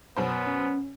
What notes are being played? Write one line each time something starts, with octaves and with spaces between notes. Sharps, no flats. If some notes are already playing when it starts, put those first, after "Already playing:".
F#2 B2 B3 C5
C#4